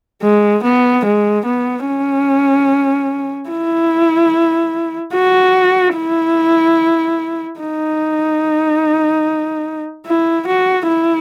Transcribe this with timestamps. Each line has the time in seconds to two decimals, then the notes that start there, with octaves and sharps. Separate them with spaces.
0.22 G#3
0.63 B3
1.05 G#3
1.45 B3
1.87 C#4
3.50 E4
5.14 F#4
5.96 E4
7.60 D#4
10.06 E4
10.47 F#4
10.88 E4